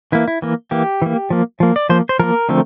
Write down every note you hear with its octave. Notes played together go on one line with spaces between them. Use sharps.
E3 A#3 E4
E4
E3 A#3
E3 A#3 G4
E3 A#3
F3 A#3
F3 A#3
D5
F3 A#3 C5
C5
F3 A#3 A#4
D3 F3 A3 C4